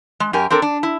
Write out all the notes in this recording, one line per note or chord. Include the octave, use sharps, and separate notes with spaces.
G#3
F#2 G4 A#4 G#5
C4 D4 A4 A#4
D4
E4